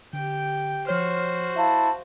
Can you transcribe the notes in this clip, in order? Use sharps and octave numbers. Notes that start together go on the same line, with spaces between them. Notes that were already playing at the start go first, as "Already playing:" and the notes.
D3 G4 G5
F3 F#4 C5 C#5 F6
E4 E5 F5 A5